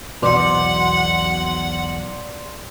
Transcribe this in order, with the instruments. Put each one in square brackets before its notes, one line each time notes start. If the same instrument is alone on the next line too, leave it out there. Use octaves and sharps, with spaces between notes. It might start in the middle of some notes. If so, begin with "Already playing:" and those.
[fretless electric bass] B1 E2 B2 [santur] C5 D5 [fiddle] F#5